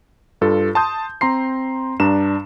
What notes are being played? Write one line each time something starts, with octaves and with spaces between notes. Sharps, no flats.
G2 F4 A4
A5 C6 D#6 G6
C4 A#5 C6 C7
G2 D4 A#5 E7